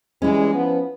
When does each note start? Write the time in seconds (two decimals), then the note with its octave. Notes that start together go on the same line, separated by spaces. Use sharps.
0.22 E3 G3 G#3 C#4 E4
0.54 F3 B3